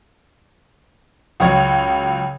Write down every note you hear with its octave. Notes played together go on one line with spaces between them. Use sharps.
C#2 F#2 C#5 G#6